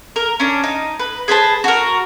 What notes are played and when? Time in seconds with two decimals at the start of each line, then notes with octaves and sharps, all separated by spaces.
0.16 A#4
0.40 C#4 D4
0.64 D#4
0.99 B4
1.28 G#4 B4 C5 A5
1.64 F#4 A#4